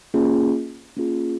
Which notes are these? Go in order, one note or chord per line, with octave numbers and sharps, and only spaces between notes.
A#3 C#4 F4 G#4
A#3 C#4 F4 G#4